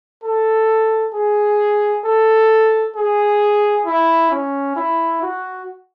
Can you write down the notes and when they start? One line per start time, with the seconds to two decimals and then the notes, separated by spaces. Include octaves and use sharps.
0.24 A4
1.14 G#4
2.05 A4
2.96 G#4
3.86 E4
4.31 C#4
4.76 E4
5.22 F#4